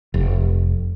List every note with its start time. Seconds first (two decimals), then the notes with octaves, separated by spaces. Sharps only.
0.14 F1